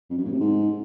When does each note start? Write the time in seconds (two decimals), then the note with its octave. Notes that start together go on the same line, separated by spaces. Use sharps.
0.10 F2
0.18 F#2
0.25 A2
0.32 C3
0.40 G#2